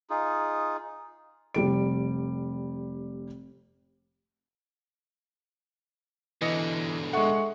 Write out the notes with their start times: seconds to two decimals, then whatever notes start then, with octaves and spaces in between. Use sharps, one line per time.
0.10 D#4 F4 G#4
1.54 F1 G3 D7
6.42 B2 D3 E3 D#5 C#7
7.13 G#3 A4 E5 F#5 C#6